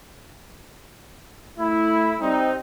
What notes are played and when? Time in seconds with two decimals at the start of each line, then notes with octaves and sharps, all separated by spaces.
1.58 A3 E4
2.20 G3 C4 D#4